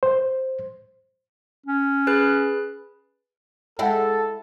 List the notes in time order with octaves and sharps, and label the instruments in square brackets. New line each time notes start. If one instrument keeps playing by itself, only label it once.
[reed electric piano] C5
[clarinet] C#4
[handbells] G#4 B4 F#6
[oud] G#3 E4 [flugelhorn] A4 [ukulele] F#5 G5